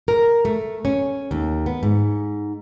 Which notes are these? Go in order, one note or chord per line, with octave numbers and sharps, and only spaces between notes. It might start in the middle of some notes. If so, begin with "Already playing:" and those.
A#4
A3
C#4
D#2
B3
G#2